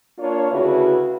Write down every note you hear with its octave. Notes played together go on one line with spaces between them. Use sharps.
A#3 D4 F4 C#5
D2 C#3 A3 E4 F#4 B4